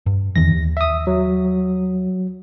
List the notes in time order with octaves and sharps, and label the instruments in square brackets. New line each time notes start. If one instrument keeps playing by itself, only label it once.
[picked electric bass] G2
[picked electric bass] E2 D#3 E3 [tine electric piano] A#6
[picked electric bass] D#2
[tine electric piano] E5 D#6
F#3